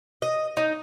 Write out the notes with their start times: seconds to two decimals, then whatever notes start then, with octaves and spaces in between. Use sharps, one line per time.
0.22 D#5
0.57 D#4